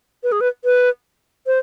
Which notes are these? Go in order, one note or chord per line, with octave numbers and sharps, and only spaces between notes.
B4
G#4
B4
B4
C5